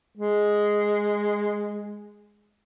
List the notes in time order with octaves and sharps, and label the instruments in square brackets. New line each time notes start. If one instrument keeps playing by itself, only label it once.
[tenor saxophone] G#3